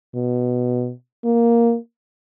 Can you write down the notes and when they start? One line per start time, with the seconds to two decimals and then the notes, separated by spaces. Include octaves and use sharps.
0.15 B2
1.25 A#3